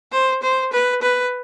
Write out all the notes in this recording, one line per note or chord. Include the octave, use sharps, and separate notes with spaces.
C5
C5
B4
B4